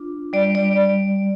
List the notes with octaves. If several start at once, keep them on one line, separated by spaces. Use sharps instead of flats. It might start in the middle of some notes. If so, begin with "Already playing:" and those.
Already playing: D4 F4
G3 D5
D5